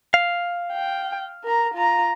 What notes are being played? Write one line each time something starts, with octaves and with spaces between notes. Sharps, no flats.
F5
G5
A#4 A#5
F4 A#5